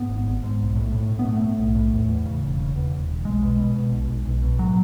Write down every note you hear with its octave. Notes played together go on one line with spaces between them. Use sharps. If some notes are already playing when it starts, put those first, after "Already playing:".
Already playing: G#2 B3
G#1
G#1
G#2
B1
A2
A2
A2
B3
A2 A3
A2
B1
A2
E2
E2
C#3
E1
C#3
E2
E1
E1
B1 G#3
B2
B2
B2
B1
B1
B1
B2
A2 F#3